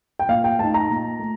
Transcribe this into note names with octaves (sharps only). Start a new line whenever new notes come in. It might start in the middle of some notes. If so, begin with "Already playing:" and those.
G5
A#2 F5
G5
A3 D#4 A5
A#5
A#2
A3